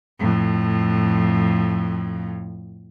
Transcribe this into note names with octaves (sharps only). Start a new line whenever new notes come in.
F2 A2